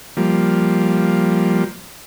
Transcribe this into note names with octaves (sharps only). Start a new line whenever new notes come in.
F3 G3 A#3